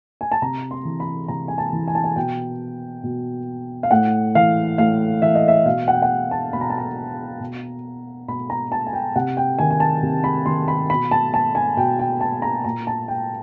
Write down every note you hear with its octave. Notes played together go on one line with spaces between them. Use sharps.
G#5
A5
C3 A#5
C6
E3
B5
C3 A#5
G#5
A5
E3
G#5
A5
G#5
B2 G5
B2
F5
A2 F#5
E3 F5
A2 F5
E3 E5
D#5
E5
B2 F5
F#5
G5
F#5
A5
B2 B5
A#5
A5
A#5
B2
B2 B5
A#5
A5
G#5
G5
C3 F#5
G5
D#3 G#5
G#5
A5
C3
B5
D#3 C6
B5
B2 B5
A5
A5
G#5
B2 G5
G5
A5
A#5
A#2 A#5
A5
G5